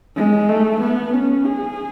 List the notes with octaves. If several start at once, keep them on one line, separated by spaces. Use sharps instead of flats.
G#3
A3
B3
C#4
G#4